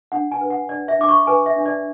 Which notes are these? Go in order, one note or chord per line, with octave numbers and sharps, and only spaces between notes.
D4 F#5
G#5
B4
F#5
D4 D5
E5
D4 D6
C#6
B4 G#5
E5
D4
D5